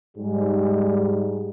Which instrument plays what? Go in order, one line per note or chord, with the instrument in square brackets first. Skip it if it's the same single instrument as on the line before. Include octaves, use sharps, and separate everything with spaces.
[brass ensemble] G#2 G3 G#3